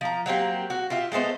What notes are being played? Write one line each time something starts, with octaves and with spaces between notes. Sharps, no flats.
F3 A#5
F#3 A#3 C4 G4
F#4
F4 G4 E5
G#3 A3 B3 C5